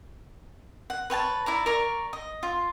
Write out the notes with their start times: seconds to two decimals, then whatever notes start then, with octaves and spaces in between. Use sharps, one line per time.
0.90 F#5
1.10 B4 C#5 G5 A5
1.46 E4 D5 A#5
1.66 A#4 D5 A#5 C#6
2.13 D#5
2.43 F4